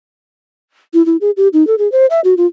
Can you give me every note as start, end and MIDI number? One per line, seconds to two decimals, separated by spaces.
0.94 1.05 64
1.06 1.17 64
1.21 1.31 68
1.37 1.48 67
1.53 1.66 63
1.67 1.75 69
1.79 1.90 68
1.92 2.06 72
2.10 2.20 76
2.24 2.34 66
2.37 2.46 65